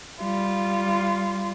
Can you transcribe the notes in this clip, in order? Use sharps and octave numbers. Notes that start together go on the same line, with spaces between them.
G3 F4